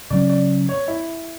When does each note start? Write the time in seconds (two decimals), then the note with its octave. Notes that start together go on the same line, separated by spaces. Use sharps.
0.10 C#3 F#3 C#4 D5
0.29 D5
0.69 C#5
0.88 E4